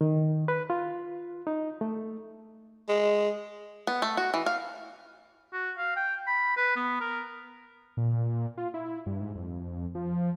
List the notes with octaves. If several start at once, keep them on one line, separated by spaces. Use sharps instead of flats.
D#3
B4
F4
D#4
A3
G#3
B3
A3
F#4
E3
F5
F#4
F5
G5
B5
B4
B3
A#4
A#2
F4
E4
G2
G#2
F2
F3